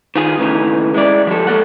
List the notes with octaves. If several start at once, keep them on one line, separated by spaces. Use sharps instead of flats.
D#3 F4 G#4
D#2 A2 C#3 E3 A#4
G#3 E4 D5
F3 G#3 G4 A4
A#3 A4 F#5